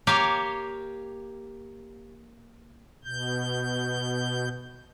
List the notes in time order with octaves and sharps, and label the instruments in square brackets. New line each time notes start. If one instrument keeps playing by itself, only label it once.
[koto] A#3 G4 C#5 F5
[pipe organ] B2 G6